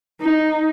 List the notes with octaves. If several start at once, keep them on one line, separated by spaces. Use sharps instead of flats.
D#4